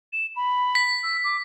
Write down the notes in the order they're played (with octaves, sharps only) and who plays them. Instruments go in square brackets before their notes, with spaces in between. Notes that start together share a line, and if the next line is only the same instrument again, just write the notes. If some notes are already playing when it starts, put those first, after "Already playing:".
[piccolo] E7
B5
[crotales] B6
[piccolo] E6
D6